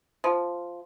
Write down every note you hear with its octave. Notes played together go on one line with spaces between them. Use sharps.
F3